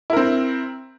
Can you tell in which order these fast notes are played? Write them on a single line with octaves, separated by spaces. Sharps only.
E4 A#4 C4